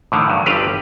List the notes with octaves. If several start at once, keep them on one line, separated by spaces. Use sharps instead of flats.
A2 D3 D#3
G2 F#3
G1 G3 C4 G4 B4 F5